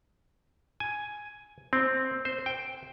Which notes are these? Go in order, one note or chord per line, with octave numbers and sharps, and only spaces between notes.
G#5
C4
C5
G5